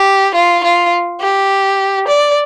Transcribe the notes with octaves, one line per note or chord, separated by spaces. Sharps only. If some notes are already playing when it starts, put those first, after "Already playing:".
Already playing: G4
F4
F4
G4
D5